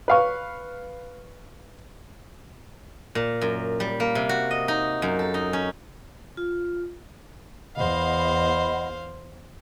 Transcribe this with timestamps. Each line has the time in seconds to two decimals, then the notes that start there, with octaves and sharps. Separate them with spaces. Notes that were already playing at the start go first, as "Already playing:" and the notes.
0.08 B4 F5 C#6
3.15 A#2
3.41 F#2
3.80 G3
4.00 A#3
4.15 C3
4.29 F#4
4.51 D#5
4.68 D#4
5.02 F#2
5.19 A4
5.34 D#4
5.53 C#4
6.37 F4
7.77 E2 C5 D#5 F5 F#5 B5